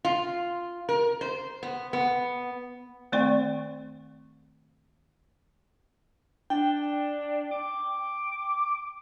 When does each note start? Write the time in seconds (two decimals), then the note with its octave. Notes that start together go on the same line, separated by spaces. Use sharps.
0.05 F4
0.89 A#4
1.21 C5
1.63 B3
1.93 B3
3.12 D#3 A3 C4 D5 G5 C#6
6.50 D4 G5
7.51 D6